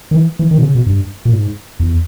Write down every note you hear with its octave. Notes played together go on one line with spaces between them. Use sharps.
D#3
E3
E3
D#3
B2
C#3
B2
G2
A#2
G#2
E2